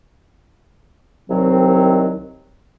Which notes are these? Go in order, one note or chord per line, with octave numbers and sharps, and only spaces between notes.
C2 D#3 F#3 C4